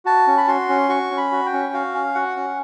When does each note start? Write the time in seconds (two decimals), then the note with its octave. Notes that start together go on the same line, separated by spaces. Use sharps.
0.05 F#4 A5
0.27 C#4
0.37 B5
0.47 F#4 C6
0.69 C#4
0.89 F#4 C#6
1.11 C#4
1.17 B5
1.32 F#4
1.46 G5
1.53 C#4
1.73 F#4 F5
1.94 C#4
2.15 F#4 F#5
2.37 C#4